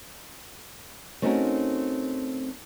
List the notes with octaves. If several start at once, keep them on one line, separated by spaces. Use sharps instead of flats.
A3 C4 C#4 D#4 F#4 A#4